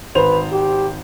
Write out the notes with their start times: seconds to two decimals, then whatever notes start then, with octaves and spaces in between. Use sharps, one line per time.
0.15 G#1 B4 C5 F7
0.52 G4